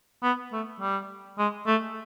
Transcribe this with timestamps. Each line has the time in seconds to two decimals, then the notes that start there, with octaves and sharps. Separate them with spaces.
0.23 B3
0.52 A3
0.80 G3
1.38 G#3
1.67 A3